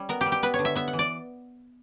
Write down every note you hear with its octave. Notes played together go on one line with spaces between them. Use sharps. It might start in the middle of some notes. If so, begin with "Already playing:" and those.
Already playing: G3 C#4
B3 A#4
G4
G3
G4
B3 B4
C#5
D3
E5
B3 E5
F#5
E3
D5